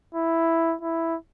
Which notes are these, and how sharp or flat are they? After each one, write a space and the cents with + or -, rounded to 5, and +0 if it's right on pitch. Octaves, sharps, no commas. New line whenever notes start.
E4 +0
E4 +0